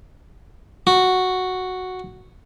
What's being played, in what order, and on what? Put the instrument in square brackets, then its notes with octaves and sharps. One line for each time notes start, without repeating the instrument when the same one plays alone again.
[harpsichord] F#4